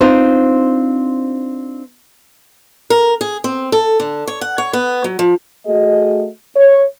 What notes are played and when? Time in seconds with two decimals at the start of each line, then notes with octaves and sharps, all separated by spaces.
0.01 C4 D4 D#4 F4 C5
2.90 A#4
3.21 G#4
3.44 C4
3.72 A4
4.00 D3
4.27 C#5
4.41 F#5
4.58 C#5
4.73 B3
5.04 F#3
5.19 F3
5.66 A3 F#4 G#4 D#5
6.56 C#5